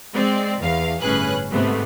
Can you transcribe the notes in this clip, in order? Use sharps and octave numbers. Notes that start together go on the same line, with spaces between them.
G#3 C4 D5
E2 F5
G1 A2 C#4 G#4 B4 F#6
G#2 C3 A3 B3